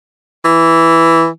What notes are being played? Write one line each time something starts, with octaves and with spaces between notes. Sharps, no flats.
E3